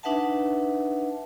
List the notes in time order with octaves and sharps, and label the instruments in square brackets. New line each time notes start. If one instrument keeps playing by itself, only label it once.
[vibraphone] D4 D#4 B4 E5 F#5 A5